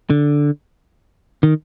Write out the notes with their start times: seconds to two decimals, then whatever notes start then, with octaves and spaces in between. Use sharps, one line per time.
0.10 D3
1.43 D#3